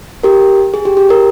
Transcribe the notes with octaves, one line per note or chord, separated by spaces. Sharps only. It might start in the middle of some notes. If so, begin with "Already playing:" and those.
G4 A#4
G#4
G4
G4
G4 A#4